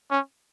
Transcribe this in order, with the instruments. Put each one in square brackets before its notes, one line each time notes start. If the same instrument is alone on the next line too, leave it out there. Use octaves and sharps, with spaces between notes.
[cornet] C#4